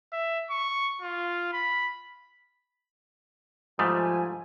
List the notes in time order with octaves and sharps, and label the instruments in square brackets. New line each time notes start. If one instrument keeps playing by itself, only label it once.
[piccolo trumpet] E5
C#6
F4
B5
[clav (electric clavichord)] G#2 G3 A3 [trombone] F3 [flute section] G#5 [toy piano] D#6